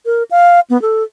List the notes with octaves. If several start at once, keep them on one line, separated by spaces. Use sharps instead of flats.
A#4
F5
B3
A4